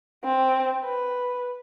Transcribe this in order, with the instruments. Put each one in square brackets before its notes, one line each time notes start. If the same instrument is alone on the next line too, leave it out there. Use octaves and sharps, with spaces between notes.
[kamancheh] C4
B4